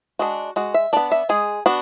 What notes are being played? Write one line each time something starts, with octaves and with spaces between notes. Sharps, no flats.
G#3 D4 F#4
G#3 F#4
E5
B3 D4 D5
E5
G#3 G#4
B3 D4 F#4